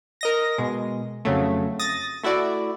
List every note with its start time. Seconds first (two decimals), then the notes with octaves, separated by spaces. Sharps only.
0.21 A#4 D#5 A#6
0.58 B2 G#3
1.25 F2 C#3 F#3 A3
1.79 D#6 A6 A#6
2.23 A3 E4 F#4 D5